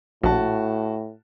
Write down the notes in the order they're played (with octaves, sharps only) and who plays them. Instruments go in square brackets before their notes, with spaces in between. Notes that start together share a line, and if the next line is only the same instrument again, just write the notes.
[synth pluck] A#1 [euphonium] A2 [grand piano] F#4 A5